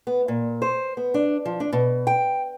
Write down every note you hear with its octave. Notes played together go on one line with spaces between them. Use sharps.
B3
A#2
C5
B3
D4
F3
D4
B2
G5